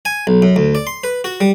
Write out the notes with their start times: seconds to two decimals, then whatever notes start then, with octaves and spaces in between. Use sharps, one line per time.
0.05 G#5
0.27 B1
0.42 F#2
0.56 D2
0.75 D5
0.87 C6
1.04 B4
1.24 F#4
1.41 G3